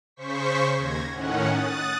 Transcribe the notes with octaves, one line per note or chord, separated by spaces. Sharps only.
C#3 C5 C#6 B6
D#2 G#6 A#6
A2 D#3 C#4 F#5
D#6 F#6 A6